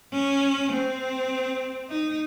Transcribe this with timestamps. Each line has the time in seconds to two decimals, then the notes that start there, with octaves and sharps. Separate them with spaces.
0.13 C#4
0.73 C4
1.89 D#4